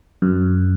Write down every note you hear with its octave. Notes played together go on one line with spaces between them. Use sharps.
F#2